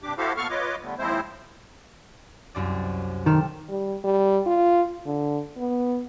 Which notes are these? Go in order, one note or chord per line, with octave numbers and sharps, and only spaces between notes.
G2 C3 D4 G4 D6
E4 F#4 G4 A4 C5 F5
A#2 B3 A4 F5 C#6 F6
F4 B4 C#5 D#5 D6
D3 G3 A3 B3
D#2 F3 G#3 C4 E4 C5
C2 F#2 D5
C3 D#3 A4 F6
G3
G3
F4
D3
B3